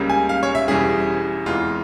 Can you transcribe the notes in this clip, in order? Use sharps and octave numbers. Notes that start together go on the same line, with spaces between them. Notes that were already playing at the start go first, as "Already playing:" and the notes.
Already playing: C#2 C#3 G3 A#3
G#5
F5
C#5
E5
E1 E2 E3 G3 C#4 G#4
F1 E2 E3 G#3 F4